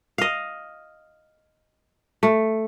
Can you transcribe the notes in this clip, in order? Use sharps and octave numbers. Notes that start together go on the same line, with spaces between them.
D#5 F5
A3